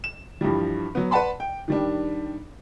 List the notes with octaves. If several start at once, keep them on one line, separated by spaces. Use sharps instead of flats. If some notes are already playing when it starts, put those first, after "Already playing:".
E7
G2 E3 F3 G3
F#3 B3
B4 D5 F#5 A5 B5 C6
G5
D#3 G3 D4